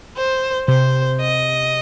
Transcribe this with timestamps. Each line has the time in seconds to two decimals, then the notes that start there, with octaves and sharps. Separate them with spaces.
0.17 C5
0.68 C3 C5
1.21 D#5